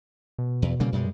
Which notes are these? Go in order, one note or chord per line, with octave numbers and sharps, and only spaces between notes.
B2
E2
C#3 G3 A#3
F#2 G3 G#3